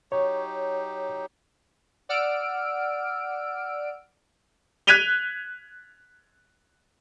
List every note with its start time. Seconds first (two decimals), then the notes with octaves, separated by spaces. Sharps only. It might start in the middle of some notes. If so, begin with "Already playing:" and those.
0.12 F#3 D#4 G4 C#5
2.09 D5 F#5 E6 F6 D7
4.87 F#6 G#6 B6 D#7 F7 G7